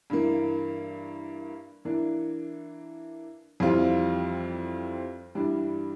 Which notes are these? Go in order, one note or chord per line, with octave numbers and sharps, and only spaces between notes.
G2 E3 A#3
E3 A#3 D4
F2 E3 G3 C4 F4
G2 E3 G3 D4